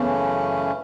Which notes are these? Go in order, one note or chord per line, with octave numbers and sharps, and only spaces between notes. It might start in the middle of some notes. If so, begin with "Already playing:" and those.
Already playing: F#2 C#3 E3 A3 B3 C#4